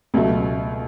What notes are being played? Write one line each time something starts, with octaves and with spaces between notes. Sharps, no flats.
C#2 B2 F#3 A3